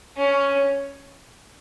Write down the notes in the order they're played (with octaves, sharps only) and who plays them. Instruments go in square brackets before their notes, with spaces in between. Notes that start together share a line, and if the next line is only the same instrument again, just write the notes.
[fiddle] C#4